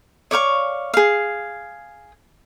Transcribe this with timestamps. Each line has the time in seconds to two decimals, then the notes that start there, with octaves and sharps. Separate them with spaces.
0.31 C#5 D5 F5 C#6
0.94 G#4 F5